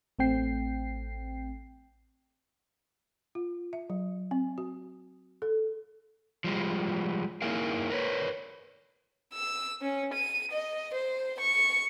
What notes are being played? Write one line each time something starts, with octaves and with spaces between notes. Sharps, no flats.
A1 A3 C4 G5 C7
F4
E5
F#3
C4
F#4
A4
F3 G3 G#3
A#3 D#4 E4 G#4 A#4 F5
A#4 B4 C#5
E6
C#4
D#7
D#5
C5
C#6